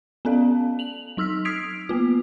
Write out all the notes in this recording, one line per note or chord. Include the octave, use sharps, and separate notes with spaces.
B3 C#4 A4 D5 F5 A5
F7 F#7
F#3 D#4 E6 F6 B6
D#6 G#6 B6 C7 D7 F7
A#3 B3 F4